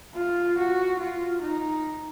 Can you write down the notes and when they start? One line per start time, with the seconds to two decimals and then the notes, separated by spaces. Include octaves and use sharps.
0.15 F4
0.58 F#4
1.00 F4
1.42 D#4